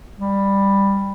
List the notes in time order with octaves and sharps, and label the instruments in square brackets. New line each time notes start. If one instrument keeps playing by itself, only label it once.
[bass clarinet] G3